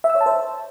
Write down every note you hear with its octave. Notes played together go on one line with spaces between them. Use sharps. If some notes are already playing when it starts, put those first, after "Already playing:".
E5
E6
C#5
A5
C5